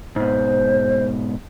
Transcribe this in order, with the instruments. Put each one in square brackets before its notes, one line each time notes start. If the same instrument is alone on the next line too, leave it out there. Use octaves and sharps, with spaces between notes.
[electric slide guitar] G#2 B2 [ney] C5